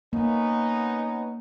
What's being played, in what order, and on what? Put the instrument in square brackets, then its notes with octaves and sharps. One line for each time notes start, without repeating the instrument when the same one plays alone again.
[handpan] A#3 [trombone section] B3 C#4 D#4